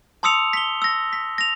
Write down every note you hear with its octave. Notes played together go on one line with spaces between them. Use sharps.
A5 C6 D#6 E6 C#7 F7
B6 G7
E6 A#6
B6
A#6 F7